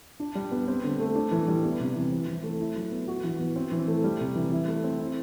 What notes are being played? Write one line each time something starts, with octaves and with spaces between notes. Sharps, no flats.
D4
G3
B3
C4
D3
A3
D4
E3
G3
B3
C3
E3
C4
E3
A3
E4
F#3
B3
F#4
E3
B3
C4
E3
A3
G3
C3
E3
E4
A3
C4
E4